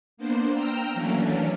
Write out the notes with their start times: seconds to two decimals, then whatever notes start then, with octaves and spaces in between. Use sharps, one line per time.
0.17 A#3 B3 D4 C5
0.53 G5 A#5 E6 F6
0.93 E3 F#3 A3 A#3 C#4 D4